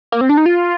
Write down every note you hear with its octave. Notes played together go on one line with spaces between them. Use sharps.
A#3
C4
D4
D#4
F4